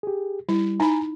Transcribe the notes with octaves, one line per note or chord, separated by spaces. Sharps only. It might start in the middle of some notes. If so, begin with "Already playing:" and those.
G4 G#4
G3 E4
D#4 G#5 A#5 B5